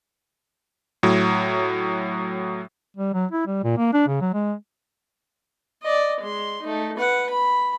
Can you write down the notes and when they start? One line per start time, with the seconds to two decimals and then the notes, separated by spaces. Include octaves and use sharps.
1.03 A2 F#3
2.97 G3
3.14 F#3
3.31 E4
3.47 G3
3.64 A#2
3.77 A#3
3.93 D4
4.07 C#3
4.21 F#3
4.33 G#3
5.82 D5 D#5
6.21 G#3 C6
6.62 A3 D#4
6.98 B4 F#5
7.29 B5